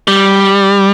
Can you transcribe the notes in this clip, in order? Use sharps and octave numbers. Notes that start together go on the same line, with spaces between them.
G3